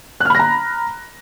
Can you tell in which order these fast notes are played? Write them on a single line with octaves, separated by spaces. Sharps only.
F#6 F6 B5 A#6 A#5